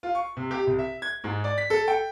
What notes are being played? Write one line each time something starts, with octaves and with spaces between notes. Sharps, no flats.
F4
C#6
C3
G4
C2
E5
G#6
G#2
D5
B6
A4
G5